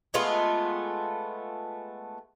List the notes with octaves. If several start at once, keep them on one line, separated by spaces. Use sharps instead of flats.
G#3 A3 B3 F4